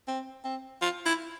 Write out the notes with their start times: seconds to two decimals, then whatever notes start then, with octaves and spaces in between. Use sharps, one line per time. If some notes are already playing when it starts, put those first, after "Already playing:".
0.08 C4
0.44 C4
0.82 F4
1.06 E4